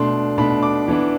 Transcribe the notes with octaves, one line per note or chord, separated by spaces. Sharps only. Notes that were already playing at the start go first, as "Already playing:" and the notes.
Already playing: B2 A3 D4 C6
B2 A3 D4 B5
D6
E3 B3 D4